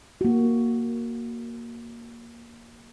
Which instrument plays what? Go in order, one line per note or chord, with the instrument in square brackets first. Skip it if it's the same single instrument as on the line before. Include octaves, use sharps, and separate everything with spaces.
[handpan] A#3 F#4